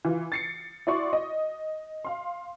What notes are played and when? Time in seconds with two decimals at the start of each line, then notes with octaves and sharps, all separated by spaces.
0.05 E3 F4
0.32 A6 C7 C#7
0.87 E4 F#4 D5 C6 C#6
1.13 D#5
2.04 F5 C6